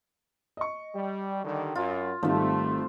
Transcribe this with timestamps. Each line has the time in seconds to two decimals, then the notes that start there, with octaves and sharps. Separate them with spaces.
0.57 D#5 C#6
0.94 G3
1.44 D3 D#3 G3
1.75 F#2 F4
2.23 G#1 D#3 F3 G3 A3 C4